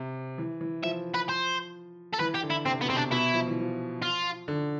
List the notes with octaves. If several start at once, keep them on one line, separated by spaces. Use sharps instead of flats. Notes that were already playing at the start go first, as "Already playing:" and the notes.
Already playing: C3
E3
E3
F3 E5
B4
C5
A4
E3 B4
G4
D3
E4
C3 C4
B3
B2
C3 C4
D4
B2 E4
F3
E3
F3
F4
D3